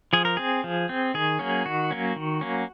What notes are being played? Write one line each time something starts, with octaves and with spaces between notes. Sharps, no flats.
F3 G#4
A#4
C4 G#4
F3
C4
D#3 G#4
F#3 A#3 C#4
D#3 F#4
F#3 A#3 C#4
D#3
F#3 A#3 C#4